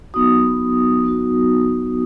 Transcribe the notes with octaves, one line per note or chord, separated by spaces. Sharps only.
F#3 B3 D#4 F#4 D#6
F#3 B3 D#4 F#4